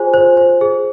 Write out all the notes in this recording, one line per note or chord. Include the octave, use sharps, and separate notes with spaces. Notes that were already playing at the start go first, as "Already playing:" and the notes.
Already playing: F4 G#4 C5 G#5
C5
C5
G#4